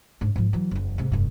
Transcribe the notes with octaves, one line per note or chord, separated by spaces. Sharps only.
G#2 D4
G#2 F3
E3 F#3
F#1 E2
G#2 C3
F1 G2